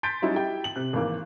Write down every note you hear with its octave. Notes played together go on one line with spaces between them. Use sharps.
C6 G6 A6 B6 D7
F#3 G3 C#4 D#4 E4 F#4
E4 G4 G5
F#7
C3 F#6
G#1 E3 A#3 D6